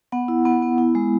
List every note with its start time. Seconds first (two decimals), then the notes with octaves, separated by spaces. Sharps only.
0.12 B3 F#5
0.28 E4
0.45 B3 F#5
0.62 B3
0.78 E4
0.95 G#3